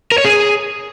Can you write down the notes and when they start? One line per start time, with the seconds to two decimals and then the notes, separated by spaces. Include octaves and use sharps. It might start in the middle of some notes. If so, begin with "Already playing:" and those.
0.12 A#4
0.18 C#5
0.25 G#4